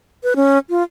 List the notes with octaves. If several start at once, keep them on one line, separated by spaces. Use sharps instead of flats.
B4
C#4
F4